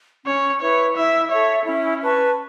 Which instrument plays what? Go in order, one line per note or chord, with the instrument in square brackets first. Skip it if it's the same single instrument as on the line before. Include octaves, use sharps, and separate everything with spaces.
[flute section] C#4 [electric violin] C#5
[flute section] E4 B4 [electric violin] C#5
[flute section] E4 [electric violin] E5
[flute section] A4 E5 [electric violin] C#5
[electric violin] C#4 [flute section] E4
[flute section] B4 A5 C#6